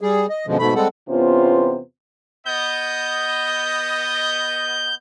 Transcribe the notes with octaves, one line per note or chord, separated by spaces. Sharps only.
G3 G#4
D#5
F#2 B2 D3 F3 G#3
G#2 B2 A3 B5
G3 G#3 C4 A4 F#5
E2 C3 B3 C#4 F4 C5
B3 D#5 G6